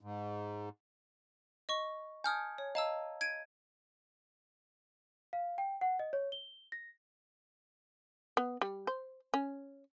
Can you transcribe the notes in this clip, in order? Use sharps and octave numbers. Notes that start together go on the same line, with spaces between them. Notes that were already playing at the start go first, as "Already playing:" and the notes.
G#2
D#5 C#6
G#5 A5 D#6 F6 G6 G#6
C#5
D#5 F5 A5 A#5 E6
G#6 D7 D#7
F5
G5
F#5
D#5
C#5
G7
A#6
B3
G3
C5
C#4